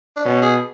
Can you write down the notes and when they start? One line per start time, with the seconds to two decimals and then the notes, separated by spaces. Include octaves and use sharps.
0.16 D4
0.25 B2 C#4
0.42 G#4